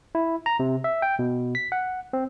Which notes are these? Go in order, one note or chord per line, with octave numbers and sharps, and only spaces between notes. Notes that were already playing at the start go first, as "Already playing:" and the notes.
E4
A#5
C3
E5
G5
B2
B6
F#5
C4